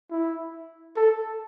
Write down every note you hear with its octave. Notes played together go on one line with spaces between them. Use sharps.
E4
A4